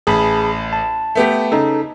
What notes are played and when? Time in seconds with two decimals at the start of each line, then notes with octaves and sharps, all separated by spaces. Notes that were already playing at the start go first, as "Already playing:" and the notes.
0.07 A1 G#4 A5 B5
0.73 A5
1.15 A3 B3 G4
1.52 C#3 D#4 A4